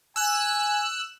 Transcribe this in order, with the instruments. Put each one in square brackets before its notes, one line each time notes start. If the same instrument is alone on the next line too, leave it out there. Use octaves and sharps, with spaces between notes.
[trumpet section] G#5 [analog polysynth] E6 F#6